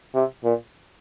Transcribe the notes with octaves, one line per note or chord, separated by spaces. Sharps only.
C3
A#2